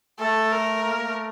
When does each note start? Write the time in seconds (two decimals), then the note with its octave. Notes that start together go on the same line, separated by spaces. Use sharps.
0.19 A3 A4
0.53 A#4
0.86 A#3
1.03 A3